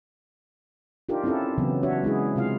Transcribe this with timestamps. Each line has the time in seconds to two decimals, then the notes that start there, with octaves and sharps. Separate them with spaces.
1.09 D4 D#4 F4 G4 A#4
1.24 C4 C#4 E4 F4 A4
1.58 C#3 E3 F#3 B3 C4
1.83 D4 F#4 C#5 E5
2.03 G#3 C#4 E4 G#4
2.36 C3 G#3 E4 F4 F5